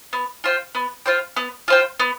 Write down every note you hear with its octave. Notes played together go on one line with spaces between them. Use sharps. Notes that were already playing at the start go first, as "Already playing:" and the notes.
B3
F4 C5 G5
B3
F4 C5 G5
B3
F4 C5 G5
B3